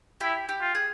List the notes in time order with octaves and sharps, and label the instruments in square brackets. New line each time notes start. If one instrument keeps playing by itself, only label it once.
[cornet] E4 [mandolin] G4
[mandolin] G4
[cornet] F4
[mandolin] G#4